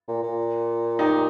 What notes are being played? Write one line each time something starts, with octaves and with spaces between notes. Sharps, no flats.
A#2
A#2
D#4 G4